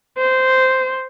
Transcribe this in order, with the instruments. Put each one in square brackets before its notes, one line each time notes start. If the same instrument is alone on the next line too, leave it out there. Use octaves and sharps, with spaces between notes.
[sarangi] C5